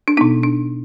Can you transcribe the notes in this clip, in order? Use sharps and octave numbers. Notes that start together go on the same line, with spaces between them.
D4
B2 B3 D#4
D4